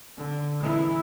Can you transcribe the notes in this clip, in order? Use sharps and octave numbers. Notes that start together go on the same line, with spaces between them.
D3
E3 E4